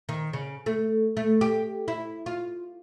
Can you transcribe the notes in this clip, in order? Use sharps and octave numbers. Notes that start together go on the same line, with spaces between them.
D#3
C#3
A3
A3
G4
E4
F4